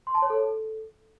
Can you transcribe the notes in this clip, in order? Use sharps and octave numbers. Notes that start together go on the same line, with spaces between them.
C6
A5
C#5
A4